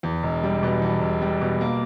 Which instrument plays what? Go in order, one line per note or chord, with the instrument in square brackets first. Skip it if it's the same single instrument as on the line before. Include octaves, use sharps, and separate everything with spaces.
[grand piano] E2
E1
G3
B2
E2
E1
G3
B2
A#3